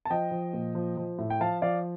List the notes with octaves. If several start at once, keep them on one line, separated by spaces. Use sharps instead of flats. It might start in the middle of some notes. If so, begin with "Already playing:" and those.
A5
F3 D#5 G5
F3
A#2
F3
F3
A2
G5
F3 F5 A5
F3 D5 F5